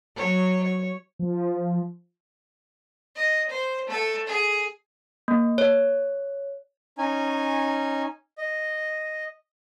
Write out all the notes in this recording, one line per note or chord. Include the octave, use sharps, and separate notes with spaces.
F#3 C#5
C#5
F3
D#5
C5
A3 A4
G#4
A#3
C#5
C#4 D#4 G#5
D#5